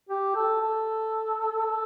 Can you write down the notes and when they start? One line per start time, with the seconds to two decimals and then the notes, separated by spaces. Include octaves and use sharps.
0.09 G4
0.35 A4
0.61 A4
1.66 A4